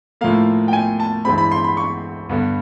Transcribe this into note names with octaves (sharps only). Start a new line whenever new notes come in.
A2 F3 A#3 F5
G5
G#5
A5
G2 E3 G#3 C4 B5
B5
C6
B5
C#6
G2 D3 G3 B3